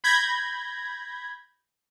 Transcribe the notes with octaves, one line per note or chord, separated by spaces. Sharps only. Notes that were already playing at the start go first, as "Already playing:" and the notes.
B5 G6 G#6 A#6